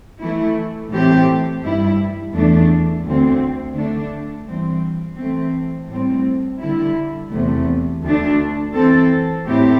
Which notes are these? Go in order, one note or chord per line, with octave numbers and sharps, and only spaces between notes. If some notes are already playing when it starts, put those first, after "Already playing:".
E3 A3 E4
A2 E3 A3 C4 G4
G2 G3 E4
E2 E3 A3 D4
D2 D3 C4
D3 A3 D4
G2 E3 C4
E3 A3 C4
A2 G3 C4
D3 G3 E4
E2 C3 A3
D2 D3 A3 D4
E3 C4 A4
A2 A3 C4 E4 G4